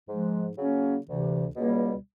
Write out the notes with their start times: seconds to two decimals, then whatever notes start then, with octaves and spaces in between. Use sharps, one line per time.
0.09 G#2 F3 G#3
0.58 C#3 F#3 A#3 C#4
1.07 D2 C3 E3
1.56 C#2 B2 G3 A#3